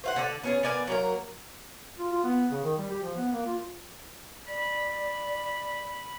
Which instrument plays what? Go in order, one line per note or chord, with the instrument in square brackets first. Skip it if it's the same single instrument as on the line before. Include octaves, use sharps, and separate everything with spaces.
[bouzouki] C5 F5 F#5
D3 A4 D5
B3 C#4 G#4
B3 A#4 D5 G#5
F#3 A#3 A#4
[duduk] F4
F4
B3
C#3
D#3
G3
G4
F3
B3
A#3
F4
[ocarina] D5 [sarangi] B5